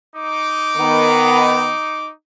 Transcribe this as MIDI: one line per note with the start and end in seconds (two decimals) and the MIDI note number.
0.16 2.11 63
0.16 2.11 86
0.77 1.71 51
0.77 1.71 59